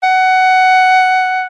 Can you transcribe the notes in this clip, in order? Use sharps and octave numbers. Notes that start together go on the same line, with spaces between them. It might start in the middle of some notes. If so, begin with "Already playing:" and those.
F#5